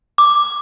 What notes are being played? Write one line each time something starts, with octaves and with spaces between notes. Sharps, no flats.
D6